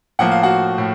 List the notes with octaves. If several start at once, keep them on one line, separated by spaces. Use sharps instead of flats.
A2 F3 A#3 F#5
F5
F#4 F#5
A2